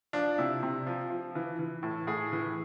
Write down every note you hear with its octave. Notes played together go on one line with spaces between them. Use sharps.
F3 D4
C3 E4
C3
F3
F3
E3
E3
A2
A2 G#4
E3